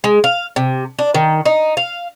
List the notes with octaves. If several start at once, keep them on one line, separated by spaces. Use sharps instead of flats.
G#3
F5
C3
D4
D#3
D#4
F5